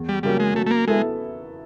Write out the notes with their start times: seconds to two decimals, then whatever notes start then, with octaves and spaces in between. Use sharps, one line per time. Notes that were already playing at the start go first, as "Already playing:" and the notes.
Already playing: E2
0.09 G3
0.23 C#3 F#3 G3 A#3 C#4
0.40 G#3
0.55 F#3 A3
0.66 A3
0.71 A#3
0.87 G#3 B3 E4 A4